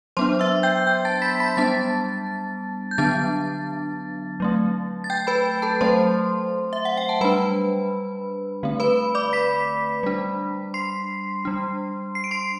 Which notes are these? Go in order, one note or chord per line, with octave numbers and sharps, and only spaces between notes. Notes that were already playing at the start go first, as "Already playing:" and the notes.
F#3 B3 D4 C5 C6
E5 E6
G5 G6
G5 G6
A5 A6
B5 B6
B5 B6
G3 B3 D4 A5 A6
G6
D3 F#3 B3 D4 A5 A6
F#3 A3 C4
A6
G5 G6
B4 B5
A4 A5
F#3 A3 C4 C5 C6
E5
F#5
G5
A5
G3 D4 B4 B5
D3 A3 C4
B4 B5
D5 D6
B5 B6
G3 D4
C6 C7
G3 D4
C7
D7
C6 C7